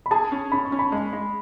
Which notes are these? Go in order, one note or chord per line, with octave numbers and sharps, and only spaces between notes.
B5
G#4 A5
C#4
C#4 B5
C#6
C#4
B5
G#3
G#3